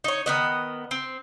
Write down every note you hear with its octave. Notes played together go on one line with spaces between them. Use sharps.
D#4 C#5
D#3 B3 D#5
C4